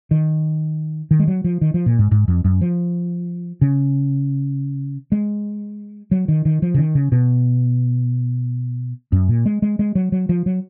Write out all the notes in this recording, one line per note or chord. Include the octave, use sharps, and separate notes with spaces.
D#3
D#3
G#3
F#3
F3
D#3
F3
A#2
G#2
G#2
F2
F#2
F3
C#3
G#3
F#3
D#3
D#3
F3
C#3
D#3
C#3
B2
F#2
A#2
G#3
G#3
G#3
F#3
F#3
F3
F#3